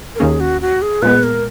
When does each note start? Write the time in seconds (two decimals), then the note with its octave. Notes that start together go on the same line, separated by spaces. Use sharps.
0.15 A#4
0.19 D#2 D#3 A#3 C#4 G#4
0.40 F#4
0.61 F#4
0.82 G#4
1.02 A#2 G#3 B3 B4
1.23 A#4